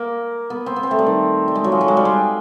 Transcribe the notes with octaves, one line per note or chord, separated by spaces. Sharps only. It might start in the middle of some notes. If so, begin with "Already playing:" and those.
Already playing: A#3
B3
C4
B3
C4
A3
G3
D#3
G3
G#3
F#3
F3
F#3
G#3
G3
G#3